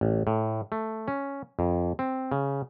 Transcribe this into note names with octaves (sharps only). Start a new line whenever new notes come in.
A1
A2
A3
C#4
F2
C4
C#3